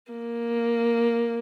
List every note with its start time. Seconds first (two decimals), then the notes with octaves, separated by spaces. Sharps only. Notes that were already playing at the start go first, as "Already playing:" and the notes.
0.12 A#3